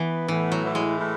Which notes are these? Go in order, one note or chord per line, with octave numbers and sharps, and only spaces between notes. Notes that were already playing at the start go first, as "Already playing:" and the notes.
Already playing: E3 B3
A2 E3
F#3
E3
G#3
A2